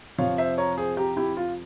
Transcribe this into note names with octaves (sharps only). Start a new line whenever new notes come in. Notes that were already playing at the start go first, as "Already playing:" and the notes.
F2 C3 F3 C#5 F5
C5 E5
A#4 C#5
G#4 C5
G4 A#4
E4 G4
F4